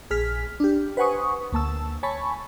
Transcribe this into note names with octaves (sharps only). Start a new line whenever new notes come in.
A#1 G#4 F6 B6
D4 G4
B4 C5 F#5 G#5 C#6 D#6
D2 A#3 A5 E6
C#5 G#5 A5 B5 C#6